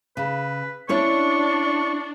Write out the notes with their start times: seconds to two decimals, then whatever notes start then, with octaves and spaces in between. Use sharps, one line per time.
0.17 C#3 B4
0.89 C#4 D4 E4 C#5 C#6